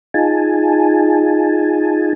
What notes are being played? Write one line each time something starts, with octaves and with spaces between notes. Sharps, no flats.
D#4 F4 G#4 G#5 A5